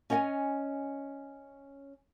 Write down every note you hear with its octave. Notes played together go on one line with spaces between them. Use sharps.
C#4 C#5 D#5 G5 G#5